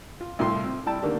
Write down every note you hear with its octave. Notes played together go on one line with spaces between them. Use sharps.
F4
C2 A2 F4 C6
C4
G3 E4 G5 A5
D3 D#3 A3 A#3 D4 G4